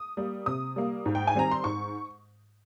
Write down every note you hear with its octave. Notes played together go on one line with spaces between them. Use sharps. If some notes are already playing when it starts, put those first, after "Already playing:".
Already playing: D#6
G3 A#3
C3 D#6
G3 A#3
G#2
G5
G#5
D#3 G3 C4 A#5
C6
G#2 C#6